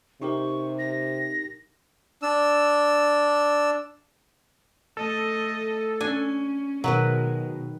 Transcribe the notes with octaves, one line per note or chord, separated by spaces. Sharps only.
C3 D#4 G4 A#4 C#6
A#6
D4 E6
A3 A4 D#5
C#4 D4 G#5
B2 D#3 F#3 G#3 A#4 B4